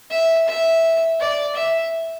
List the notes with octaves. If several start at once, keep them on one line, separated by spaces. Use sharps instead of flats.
E5
E5
D5
E5